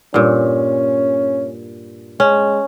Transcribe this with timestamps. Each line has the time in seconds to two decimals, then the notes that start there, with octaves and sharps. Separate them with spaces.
0.14 G2 A#2 C#4
2.20 G#3 C#4